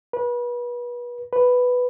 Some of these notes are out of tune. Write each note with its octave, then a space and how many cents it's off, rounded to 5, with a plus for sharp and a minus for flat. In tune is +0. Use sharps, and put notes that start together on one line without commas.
B4 -30
B4 +5